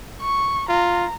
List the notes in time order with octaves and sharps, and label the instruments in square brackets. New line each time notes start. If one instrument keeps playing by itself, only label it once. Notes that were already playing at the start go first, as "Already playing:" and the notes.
[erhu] C#6
[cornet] F4 [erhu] A#5